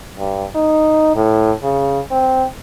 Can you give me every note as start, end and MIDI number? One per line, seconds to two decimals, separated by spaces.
0.18 0.44 43
0.55 1.11 63
1.15 1.52 45
1.63 2.00 49
2.11 2.44 60